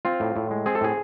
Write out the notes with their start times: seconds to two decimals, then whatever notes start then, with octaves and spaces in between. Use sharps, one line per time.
0.05 C4 F4
0.20 A2
0.36 A2
0.51 G#3
0.66 C4 G#4
0.75 A4
0.81 A2 G#4